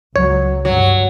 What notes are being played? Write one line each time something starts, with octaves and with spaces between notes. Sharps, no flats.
C#2 F#3 C#5
G2 F#3